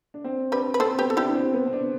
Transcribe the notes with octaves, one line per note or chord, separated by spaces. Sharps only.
D4
C4
D4 G4 B4
B4
C4 A4 C5
B3 G4 B4
A4
D4 E4 G4
D4
C4
B3
C4
D4